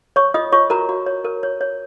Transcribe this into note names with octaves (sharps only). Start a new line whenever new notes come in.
C#5 C#6
F4 D#5 D#6
F4 C#5 C#6
F#4 A#4 A#5
F#4
C#5
A#4
C#5
C#5